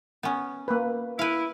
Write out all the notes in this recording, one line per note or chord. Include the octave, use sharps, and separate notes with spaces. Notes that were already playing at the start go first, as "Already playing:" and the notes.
B3 C#4
A#3 B4
E4 B4 F5